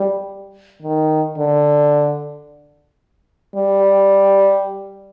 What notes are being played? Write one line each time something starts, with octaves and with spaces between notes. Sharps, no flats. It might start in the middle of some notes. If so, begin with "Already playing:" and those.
Already playing: G3
D#3
D3
G3